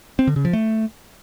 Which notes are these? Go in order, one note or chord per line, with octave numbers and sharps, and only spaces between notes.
C4
D3
C#3
F3
A3